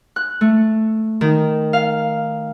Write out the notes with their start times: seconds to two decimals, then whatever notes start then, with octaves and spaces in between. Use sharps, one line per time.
0.16 F#6
0.41 A3
1.21 D#3
1.73 F5